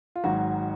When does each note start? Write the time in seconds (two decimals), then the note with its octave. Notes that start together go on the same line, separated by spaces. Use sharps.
0.16 F4
0.24 G#1 G#2 F#3 F#4